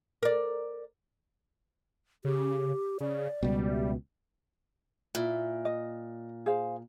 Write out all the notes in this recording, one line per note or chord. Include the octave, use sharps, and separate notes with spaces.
A#4 D5
C#3 G4
C#3 D5
C#2 B2 G3
E5
A#2 E4
D#5
G#4 C5 F5